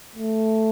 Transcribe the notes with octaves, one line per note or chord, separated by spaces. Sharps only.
A3